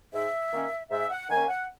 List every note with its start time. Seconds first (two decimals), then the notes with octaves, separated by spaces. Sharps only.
0.13 G#2 E5
0.52 D#3 A#3 C#4
0.90 G#2 E5
1.10 F#5
1.29 D#3 A#3 C#4 G#5
1.49 F#5